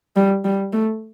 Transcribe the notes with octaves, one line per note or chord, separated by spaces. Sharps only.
G3
G3
A3